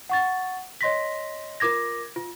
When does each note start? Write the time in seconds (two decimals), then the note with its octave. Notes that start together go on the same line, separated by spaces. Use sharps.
0.09 F#5 C#6 A6
0.81 C#5 D#5 C6 A#6 B6
1.60 F4 A#4 D6 G#6 A#6
2.16 F4